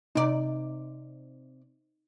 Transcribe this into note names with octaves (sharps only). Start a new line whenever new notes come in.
C3 D#4 D5